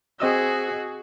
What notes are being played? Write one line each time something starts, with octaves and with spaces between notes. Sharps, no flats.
C4 F#4 G#4 D#5 E6